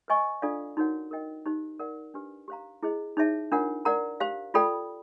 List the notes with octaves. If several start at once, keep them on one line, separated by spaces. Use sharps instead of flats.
B4 D#5 G#5 C#6
D4 F4 A4 D5 F5
D#4 F#4 A#4 C#5 F#5
A#4 D#5 G5
D#4 G4 C5
A#4 D5 F#5
D4 G4 B4
G4 C5 F5 A#5
E4 G#4 C5 D#5
D#4 G#4 C#5 E5 A5
D4 F4 A#4 C#5 F#5
A#4 D5 F#5 A#5
G4 C5 F5
F4 A4 D5 G5 B5